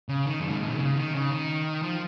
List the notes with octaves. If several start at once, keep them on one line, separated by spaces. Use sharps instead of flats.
C#3
D#3
F#2
G#2
A#2
B2
C#3
D#3
C#3
D#3
F3